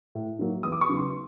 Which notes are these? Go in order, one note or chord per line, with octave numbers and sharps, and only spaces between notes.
A2
F#3 A#3 D#4
E2 D#6
D6
C#6
C#3 F#3 B3 D#4
C6